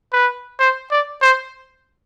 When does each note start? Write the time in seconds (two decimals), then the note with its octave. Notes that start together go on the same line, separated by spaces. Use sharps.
0.13 B4
0.60 C5
0.91 D5
1.22 C5